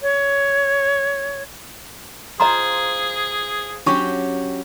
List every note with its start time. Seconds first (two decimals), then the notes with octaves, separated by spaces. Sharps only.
0.02 C#5
2.40 F4 G#4 C5 D#5 A#5 C6
3.86 F#3 C#4 D4 G4 C#6